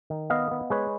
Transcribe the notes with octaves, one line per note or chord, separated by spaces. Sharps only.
D#3
B3 D#5 F5
B3
G#3 B4 C#5